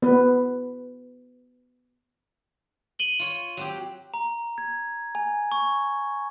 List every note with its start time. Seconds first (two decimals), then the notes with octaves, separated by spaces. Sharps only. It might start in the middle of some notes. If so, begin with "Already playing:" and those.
0.02 B3 B4
2.99 D#7 F#7 G7
3.19 F4 C#5
3.57 F#3 C4 G4
4.14 A#5
4.58 G#6
5.15 G#5
5.51 C#6